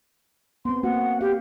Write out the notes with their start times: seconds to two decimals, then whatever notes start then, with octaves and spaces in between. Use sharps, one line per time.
0.65 B3 C4 C6
0.83 A#3 F#4 F#5
1.21 G4 F5